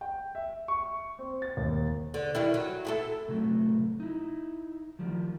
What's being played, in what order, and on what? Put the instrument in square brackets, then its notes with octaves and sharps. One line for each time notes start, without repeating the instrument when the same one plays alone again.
[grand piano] G5
E5
C#6
C4
A6
D#2
[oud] D3
D#3 G3 E4
F#3
E4 G#4 A4
[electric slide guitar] A2 C3 F#3 A3
D#4 E4
D#3 F3 G3